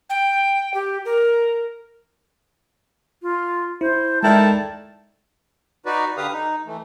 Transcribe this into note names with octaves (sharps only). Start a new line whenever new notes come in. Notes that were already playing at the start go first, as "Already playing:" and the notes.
G5
G4
A#4
F4
E4 C5
D#3 G#3 E4 A4 D5 G5 A5
D#4 F#4 B4 D5
D3 G4 B4 F5 D#6
D#4
E3 A3